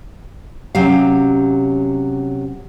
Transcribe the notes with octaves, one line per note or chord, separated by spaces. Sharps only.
C3 F#3 C#4 G4 F5